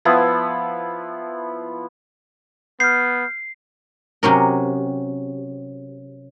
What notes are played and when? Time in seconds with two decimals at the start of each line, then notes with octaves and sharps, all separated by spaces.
0.05 F3 B3 E4
2.80 B3 F6 G6 C7
4.23 C3 F#3 C#4 A#4